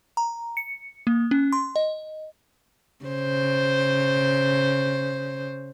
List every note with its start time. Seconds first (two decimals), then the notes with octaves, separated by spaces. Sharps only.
0.17 A#5
0.57 C#7
1.07 A#3
1.31 C#4
1.53 C6
1.76 D#5
3.05 C#3 C5